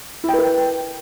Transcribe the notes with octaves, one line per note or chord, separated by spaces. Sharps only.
E4 A#4 B4 G5